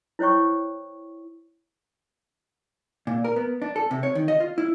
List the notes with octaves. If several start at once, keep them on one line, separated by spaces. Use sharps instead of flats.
E4 C5 C#5 G5 C#6
A#2
A#4
B3
D4
A4
C3
C#5
D#3
D#5
F4
E4